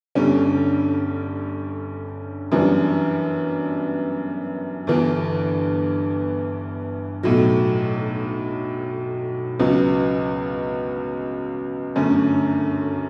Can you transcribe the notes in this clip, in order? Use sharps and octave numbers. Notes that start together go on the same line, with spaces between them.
G1 G2 D3 G3 C#4
F#2 E3 G3 B3 D4
G1 G2 E3 B3
B1 A2 F#3
C#2 C#3 F#3 B3
G1 F#2 D3 A3 C#4